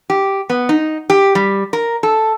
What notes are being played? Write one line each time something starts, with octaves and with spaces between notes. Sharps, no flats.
G4
B3
D#4
G4
G3
A#4
A4